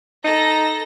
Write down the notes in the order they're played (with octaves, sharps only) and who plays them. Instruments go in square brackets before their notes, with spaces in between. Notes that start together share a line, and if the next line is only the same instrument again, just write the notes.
[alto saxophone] D#4 [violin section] A4 A#6 [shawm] A#5